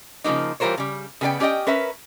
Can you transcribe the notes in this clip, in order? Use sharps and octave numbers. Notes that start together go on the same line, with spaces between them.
C#3 F3 G#3 A#3 D#4
E3 G3 F4 A#4 C5 C#5
C#3 G3
C#3 B3 G#4 D5 G5
C#4 G4 D5 D#5 G5
C#4 A#4 B4 E5